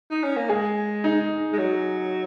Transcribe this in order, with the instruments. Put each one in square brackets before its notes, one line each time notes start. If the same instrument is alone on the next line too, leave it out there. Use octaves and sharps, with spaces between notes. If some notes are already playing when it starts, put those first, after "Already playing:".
[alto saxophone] D#4
C#4
A#3
[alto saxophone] G#3 [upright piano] G#4
[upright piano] D#4
[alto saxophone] G#3
F#3